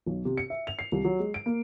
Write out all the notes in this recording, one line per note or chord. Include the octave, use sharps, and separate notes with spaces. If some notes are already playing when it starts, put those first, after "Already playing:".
B1
C3
C#7
E5
F7
C7
C2
F#3
G#3
D7
A#3